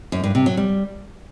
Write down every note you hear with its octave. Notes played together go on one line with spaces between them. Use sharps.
F#2
G2
C3
F#3
G3